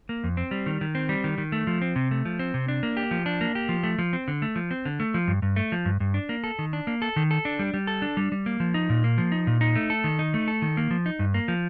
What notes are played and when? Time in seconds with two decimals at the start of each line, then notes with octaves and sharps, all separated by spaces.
0.09 A#3
0.24 F2
0.37 C4
0.51 G3
0.66 D#3
0.81 D#3
0.95 C4
1.09 G3
1.24 D#3
1.38 D#3
1.52 A3
1.67 F3
1.82 C4
1.96 C3
2.11 A3
2.25 F3
2.39 C4
2.54 C3
2.68 D4
2.83 A#3
2.97 G4
3.11 F3
3.26 D4
3.41 A#3
3.55 G4
3.69 F3
3.83 A3
3.99 F3
4.13 C4
4.28 D3
4.42 A3
4.56 F3
4.71 C4
4.85 D3
5.00 A3
5.14 F3
5.28 G2
5.42 G2
5.56 A3
5.72 F3
5.85 G2
6.00 G2
6.14 D4
6.29 A#3
6.44 A4
6.59 D#3
6.73 D4
6.87 A#3
7.02 A4
7.16 D#3
7.31 A4
7.45 D4
7.59 G3
7.74 G3
7.87 A4
8.02 D4
8.17 G3
8.32 G3
8.46 A#3
8.60 F3
8.74 D#4
8.90 A#2
9.04 A#3
9.18 F3
9.32 D#4
9.47 A#2
9.61 D#4
9.76 A3
9.90 A4
10.04 D#3
10.19 D#4
10.34 A3
10.48 A4
10.62 D#3
10.77 A#3
10.91 F3
11.06 D#4
11.19 G2
11.34 A#3
11.48 F3